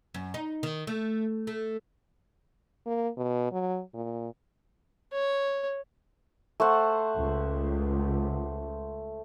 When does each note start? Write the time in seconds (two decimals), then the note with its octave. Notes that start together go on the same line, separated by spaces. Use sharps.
0.14 F#2
0.34 D#4
0.63 D#3
0.87 A3
1.47 A3
2.86 A#3
3.17 B2
3.52 F#3
3.94 A#2
5.13 C#5
6.60 A3 C5 F#5
7.16 C#2